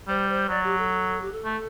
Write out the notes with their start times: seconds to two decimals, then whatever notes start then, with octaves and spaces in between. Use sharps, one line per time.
0.08 G3 C5
0.29 C5
0.49 F#3 D5
0.63 G4
0.78 A4
1.21 G4
1.31 A4
1.45 A3